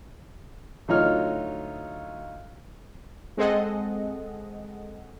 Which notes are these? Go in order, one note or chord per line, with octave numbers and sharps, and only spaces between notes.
D2 F#3 D#4 F4 C#5 F6
G#3 C4 G#4 A4 D#5 F#5